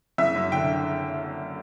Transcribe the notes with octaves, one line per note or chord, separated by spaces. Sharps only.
F#1 E5
F#2
D3 G5